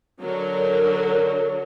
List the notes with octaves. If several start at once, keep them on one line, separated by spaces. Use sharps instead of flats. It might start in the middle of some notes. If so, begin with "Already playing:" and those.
D3 F#3 A#4